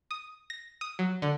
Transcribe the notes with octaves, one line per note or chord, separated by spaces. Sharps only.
D#6
A#6
D#6
F#3
D3